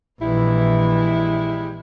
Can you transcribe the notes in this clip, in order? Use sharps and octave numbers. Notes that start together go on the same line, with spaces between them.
A#1 E3 G3 G#3 E4